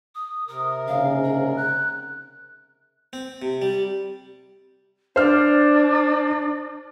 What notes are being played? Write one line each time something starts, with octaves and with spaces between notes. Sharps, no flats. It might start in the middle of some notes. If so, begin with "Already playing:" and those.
D#6
C3 A#4 D#6
A#1 G#2 C#3 F5
G#4
F#6
C4
C3
G3
D4 C5 F6